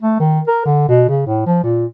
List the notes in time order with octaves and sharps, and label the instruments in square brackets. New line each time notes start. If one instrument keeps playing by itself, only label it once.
[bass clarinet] A3
D#3
A#4
D3
B2
C#3
A2
F3
A#2